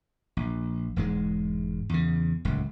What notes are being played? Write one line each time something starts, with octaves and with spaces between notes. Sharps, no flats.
A#1
E1 G#2 G#3
E2 C#3
D1 C#2